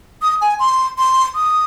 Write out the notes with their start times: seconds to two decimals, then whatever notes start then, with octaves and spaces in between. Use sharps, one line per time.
0.22 D#6
0.41 G#5
0.59 C6
0.98 C6
1.35 D#6